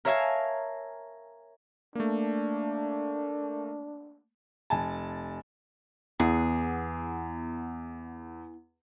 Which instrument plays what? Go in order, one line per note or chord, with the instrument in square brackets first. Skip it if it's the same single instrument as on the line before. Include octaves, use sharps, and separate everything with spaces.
[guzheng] A#4 C#5 E5 F5 G#5 A5
[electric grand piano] A3 A#3 [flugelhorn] D4
[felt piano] F1 G#5 A5
[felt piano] E2 [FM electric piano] B3 E4 F#5 [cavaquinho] G#4